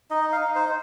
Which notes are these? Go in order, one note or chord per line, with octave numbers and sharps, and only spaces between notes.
D#4 D#5
F5
D#4
C5